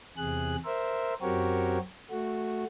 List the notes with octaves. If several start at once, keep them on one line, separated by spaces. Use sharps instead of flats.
E2 C3 G#4 F#6
A#4 C5 E5
F#2 C4 F#4 G4 A#4 C#5
A3 F#4